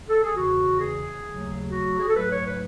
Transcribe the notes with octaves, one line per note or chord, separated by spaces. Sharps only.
A4
G#4
E2 C#3 E3 F#4
G#4
D#2 C#3 F#3 A3
F#4
G#4
A4
G#2 F#3 A3 B4
C#5
B4